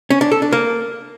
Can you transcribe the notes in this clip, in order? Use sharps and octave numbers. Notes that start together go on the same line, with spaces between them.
C#4
D4
A4
D4
A#3